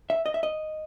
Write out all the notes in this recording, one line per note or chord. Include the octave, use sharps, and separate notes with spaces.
E5
D#5
E5
D#5